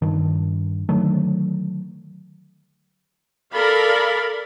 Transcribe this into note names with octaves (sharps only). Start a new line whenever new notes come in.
G2 D#3
D3 D#3 F#3 A3
A4 A#4 D5 F5 B5